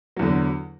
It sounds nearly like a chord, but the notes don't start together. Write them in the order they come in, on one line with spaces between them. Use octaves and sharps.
F#3 E2 D3